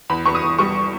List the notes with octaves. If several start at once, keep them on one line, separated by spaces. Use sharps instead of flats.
E2 B5
E2 C#6
D#6
E2
G3 C#6